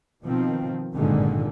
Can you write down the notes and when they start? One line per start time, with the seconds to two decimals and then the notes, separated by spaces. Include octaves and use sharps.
0.23 B2 D#3 F3 C4
0.95 G#1 G2 A#2 D3 D#3 G#3